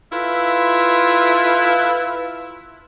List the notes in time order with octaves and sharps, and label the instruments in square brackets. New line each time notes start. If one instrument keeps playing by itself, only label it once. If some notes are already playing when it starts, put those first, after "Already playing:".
[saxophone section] E4 F4 A4 B4 E5